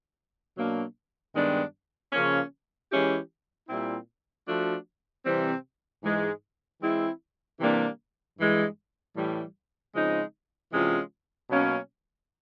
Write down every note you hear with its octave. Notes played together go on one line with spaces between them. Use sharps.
B2 F#3 A#3 D4
G2 D#3 G#3 B3 D4
C#3 F3 A#3 C#4
E3 G#3 C#4 E4 G4
A#2 G3 C4 E4
F3 A3 D4 F#4
C3 E3 G3 C4
G#2 E3 G#3
E3 G#3 C4 E4
C3 E3 G3 A#3 D4
G2 E3 G#3
A2 E3 G3
C#3 F3 G#3 C4 D#4
C3 E3 G#3 C#4 F4
B2 F#3 A#3 C#4